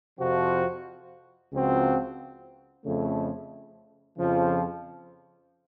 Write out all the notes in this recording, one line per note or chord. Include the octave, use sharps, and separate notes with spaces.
F2 C3 F3 C4 F#4
C#2 C#3 F3 C4 F#4
F2 C#3 A3
F2 C#3 F3